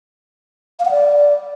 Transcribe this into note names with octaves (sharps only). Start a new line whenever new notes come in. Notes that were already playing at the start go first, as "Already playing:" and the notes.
F5
F#5
D5